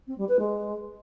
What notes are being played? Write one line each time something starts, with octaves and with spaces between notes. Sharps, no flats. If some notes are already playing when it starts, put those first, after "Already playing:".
C4
G3
B4
G#3